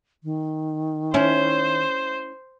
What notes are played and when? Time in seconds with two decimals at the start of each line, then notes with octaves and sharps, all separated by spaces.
0.24 D#3
1.14 C#4 E4 C5